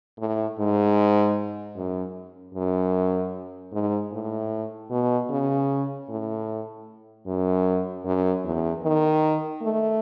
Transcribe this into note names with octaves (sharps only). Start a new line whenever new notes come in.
A2
G#2
F#2
F#2
G#2
A2
B2
C#3
A2
F#2
F#2
E2
D#3
A3